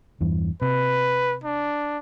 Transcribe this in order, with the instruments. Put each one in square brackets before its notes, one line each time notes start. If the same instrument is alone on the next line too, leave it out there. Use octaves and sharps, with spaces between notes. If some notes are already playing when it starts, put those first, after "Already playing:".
[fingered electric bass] E2 G2 E3
[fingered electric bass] C3 [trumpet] B4
[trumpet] D4